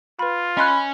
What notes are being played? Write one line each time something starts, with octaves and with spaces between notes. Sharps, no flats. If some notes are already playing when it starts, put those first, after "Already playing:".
F4 B4 B5
C#4 D#5 G#5 B5 C6 F#6